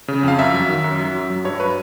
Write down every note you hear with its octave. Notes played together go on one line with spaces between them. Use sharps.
C#3
F2 F5
F#2 E5
F#3
D#3
F#2
F#3
F#2
F#3
G2 C#5
F#3 B4